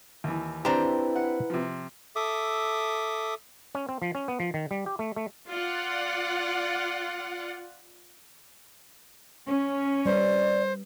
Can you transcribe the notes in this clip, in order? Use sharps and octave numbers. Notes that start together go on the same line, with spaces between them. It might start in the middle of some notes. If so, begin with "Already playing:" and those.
D#2 E3
C4 D4 E4 G4 B4 C5 A#5
F#5
C3 F3
A4 E5 D6 D#6
C#4
C4
F3
C#4
B3
F3
D#3
G3
G4
A3
A3
F4 D5 F#5
C#4
G3 B4 C5 D5